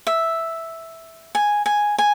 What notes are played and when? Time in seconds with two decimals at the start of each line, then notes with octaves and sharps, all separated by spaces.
0.07 E5
1.35 G#5
1.66 G#5
1.98 G#5